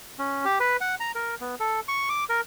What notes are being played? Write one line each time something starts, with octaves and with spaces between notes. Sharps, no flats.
C#4
G4
B4
F#5
A#5
A#4
B3
A4
C#6
D6
A#4